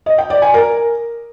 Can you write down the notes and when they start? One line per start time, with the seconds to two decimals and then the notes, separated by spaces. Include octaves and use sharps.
0.06 D#5
0.18 G5
0.30 D5
0.42 G#5
0.54 A#4